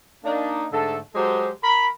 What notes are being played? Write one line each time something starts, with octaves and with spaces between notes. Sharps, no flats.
A#3 D4 D#4
G#2 D3 A3 A4
F#3 G#3 G4 A4 C5
A#4 B5